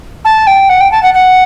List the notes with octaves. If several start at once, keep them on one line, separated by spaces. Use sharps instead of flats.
A5
G5
F#5
G5
A5
F#5
F#5